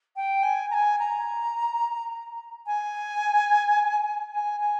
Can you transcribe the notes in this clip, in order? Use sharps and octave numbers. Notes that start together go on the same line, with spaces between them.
G5
G#5
A#5
G#5
A#5
G#5
G#5
G#5